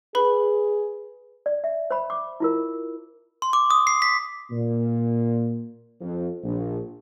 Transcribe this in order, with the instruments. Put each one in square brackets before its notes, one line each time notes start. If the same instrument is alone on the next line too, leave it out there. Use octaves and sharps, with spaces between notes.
[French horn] G#4 [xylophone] B4 B5
[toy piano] D5
E5
C5 B5
D6
E4 F4 A#4
[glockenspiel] C6
D6
D#6
C7
B6
[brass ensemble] A#2
F2
A#1